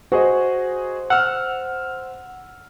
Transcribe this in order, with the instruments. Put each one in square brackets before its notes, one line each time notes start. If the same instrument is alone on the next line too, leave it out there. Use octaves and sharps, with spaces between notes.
[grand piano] F#4 G#4 D#5 [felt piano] C5
[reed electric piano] F#5 [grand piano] E6 F6